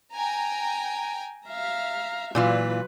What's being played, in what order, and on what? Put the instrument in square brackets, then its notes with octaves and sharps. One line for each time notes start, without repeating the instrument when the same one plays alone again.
[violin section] G5 G#5 A#5
[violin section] E5 [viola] F5 A#5
[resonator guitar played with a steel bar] A#2 E3 F4 [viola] F#3 B4